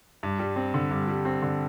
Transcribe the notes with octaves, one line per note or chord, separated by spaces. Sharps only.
G2
G3
C4
D3
G2
G3
C4
D3